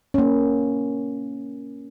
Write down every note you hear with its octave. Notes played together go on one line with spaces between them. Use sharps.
A#3 C#4